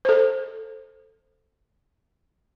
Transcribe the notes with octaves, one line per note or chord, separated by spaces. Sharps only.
A4 C5